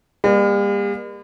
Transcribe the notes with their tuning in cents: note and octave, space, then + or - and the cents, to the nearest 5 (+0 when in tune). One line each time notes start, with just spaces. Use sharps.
G3 +45 A#3 +30